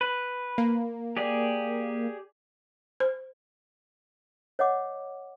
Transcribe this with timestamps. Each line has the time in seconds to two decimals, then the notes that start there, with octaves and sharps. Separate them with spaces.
0.01 B4
0.58 A#3
1.17 G4 G#4 D5
3.00 C5
4.59 C#5 D#5 F#5 D6